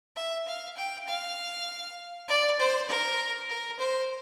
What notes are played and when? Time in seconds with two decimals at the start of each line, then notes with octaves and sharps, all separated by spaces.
0.16 E5
0.47 F5
0.77 G5
1.07 F5
2.28 D5
2.59 C5
2.88 A#4
3.49 A#4
3.79 C5